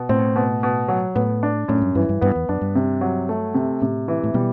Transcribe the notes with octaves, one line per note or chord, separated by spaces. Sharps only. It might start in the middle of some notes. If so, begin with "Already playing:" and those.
Already playing: B2
A2 C4
B2
B2
F#3
A2 B3
D4
F#2 A2
G2
G2 E3
G2
G2 B3
E2
F#2 D4
G2
C3
F#3
A3
C3
A2 C3
E3
A2
B2 G3